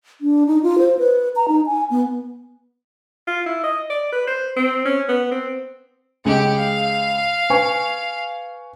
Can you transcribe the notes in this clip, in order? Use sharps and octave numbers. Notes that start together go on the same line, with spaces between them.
D4
D#4
F4
C5
B4
A#5
D#4
G#5
B3
F4
E4
D#5
D5
B4
C5
C4
C#4
B3
C4
C#2 G4 G#4 D#5 F#5
F5
B4 G#5 C#6